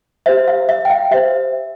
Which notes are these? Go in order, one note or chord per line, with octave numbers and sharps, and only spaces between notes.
G4 C5 E5
F5
E5
G5
F5
G4 C5 E5